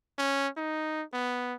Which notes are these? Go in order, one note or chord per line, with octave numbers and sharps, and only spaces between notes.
C#4
D#4
B3